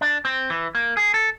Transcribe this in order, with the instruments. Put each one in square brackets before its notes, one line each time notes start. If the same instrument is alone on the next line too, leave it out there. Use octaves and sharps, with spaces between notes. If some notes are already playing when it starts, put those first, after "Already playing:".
[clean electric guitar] D4
C4
E3
A#3
G#4
A4